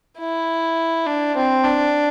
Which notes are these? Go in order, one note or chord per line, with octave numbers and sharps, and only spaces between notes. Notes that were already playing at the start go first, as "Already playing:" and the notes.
E4
D4
C4
D4